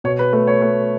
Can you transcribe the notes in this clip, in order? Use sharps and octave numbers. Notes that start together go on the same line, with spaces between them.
B2 C#5
B4
A3 B4
C#5
A3 B4